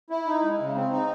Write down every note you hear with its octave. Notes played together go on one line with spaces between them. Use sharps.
E4
D#4
G#3
C#3
C4
D#4